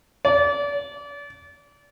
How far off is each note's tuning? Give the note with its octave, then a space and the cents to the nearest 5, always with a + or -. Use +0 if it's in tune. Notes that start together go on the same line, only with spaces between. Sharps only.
D5 -30